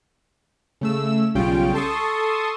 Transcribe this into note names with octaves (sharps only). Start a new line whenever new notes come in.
C#3 A3 E6
B1 C#3 G3 C#4 F4 G5
A4 A5 C6 C#6 D#6